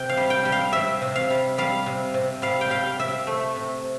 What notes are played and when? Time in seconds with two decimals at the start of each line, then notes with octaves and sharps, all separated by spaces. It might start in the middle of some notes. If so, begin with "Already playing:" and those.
Already playing: C3 G5
0.09 F5
0.17 G3
0.30 G5
0.45 G3
0.52 F5
0.73 C3 E5
1.02 C3
1.16 F5
1.30 G3
1.58 G3 F5
1.86 C3
2.14 C3
2.42 G3 F5
2.61 G5
2.70 G3 F5
2.99 C3 E5
3.27 A3
3.56 C3